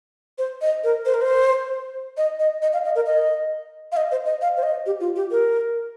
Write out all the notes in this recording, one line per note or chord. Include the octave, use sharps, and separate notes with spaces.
C5
D#5
A#4
C5
A#4
C5
D#5
D#5
D#5
F5
D#5
A#4
D#5
F5
D#5
C5
D#5
F5
C5
D#5
G4
F4
G4
A#4